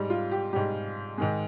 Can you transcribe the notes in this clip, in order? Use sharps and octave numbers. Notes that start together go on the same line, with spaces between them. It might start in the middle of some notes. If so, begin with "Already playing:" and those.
Already playing: G#2 G3
F4
G4
G#2 G3 G4
G#2 D#3 G#3